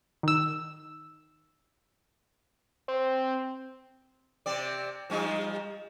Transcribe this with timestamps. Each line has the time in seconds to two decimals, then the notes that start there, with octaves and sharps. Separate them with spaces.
0.23 D#3 E6
2.88 C4
4.46 C3 C4 D5
5.10 F3 G3 D#4